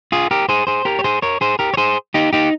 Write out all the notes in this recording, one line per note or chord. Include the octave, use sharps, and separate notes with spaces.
F4 G#4
G4 A#4
G#4 C5
G#4 C5
G4 A#4
C#5
G#4 C5
A#4 C#5
G#4 C5
G4 A#4
C#5
G#4 C5
D#4 G4
D#4 G4